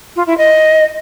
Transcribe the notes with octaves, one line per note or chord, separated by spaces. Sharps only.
F4
E4
D#5